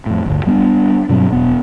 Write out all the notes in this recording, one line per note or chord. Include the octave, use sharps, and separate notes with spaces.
F2 A2
G1 D2
G3 B3 C#4 D4
G2 B2 F#3 C4
E1 B3